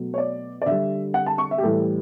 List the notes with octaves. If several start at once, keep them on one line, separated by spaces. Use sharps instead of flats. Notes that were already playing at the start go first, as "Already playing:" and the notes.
Already playing: B2 F#3 A3
C#5
D5
D5
D3 G3 E5
F#5
A5
C#6
E5
G4
A2 E3 G3 A4